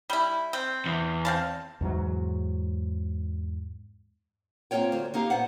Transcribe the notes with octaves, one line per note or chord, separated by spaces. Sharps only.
G3 E4
C4
E2
C4 F5 A5
E2 G#2 F#3
A#3 C4 D#4 F4 C#5 G5
D2 C5
A#3 D#4 G4 F5
A#2 B3 C5 F#5